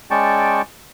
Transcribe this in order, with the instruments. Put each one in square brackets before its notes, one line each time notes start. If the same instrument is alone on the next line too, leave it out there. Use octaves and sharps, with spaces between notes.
[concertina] G#3 C#4 D5 G5 A5 C#6